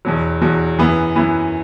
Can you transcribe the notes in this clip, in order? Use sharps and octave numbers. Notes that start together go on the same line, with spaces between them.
E2 B2 F#3
E2 B2 F#3
F#2 E3 B3
F#2 E3 B3